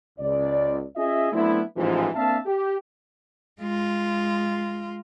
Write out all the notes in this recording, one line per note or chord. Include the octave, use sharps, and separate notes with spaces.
C#2 D5
C#4 F4 G#4 D#5 E5
F#3 A3 B3 C4 D4 E4
A1 G#2 E3 F3
A#3 C4 D4 E5 F5 A5
G4
G#3 F4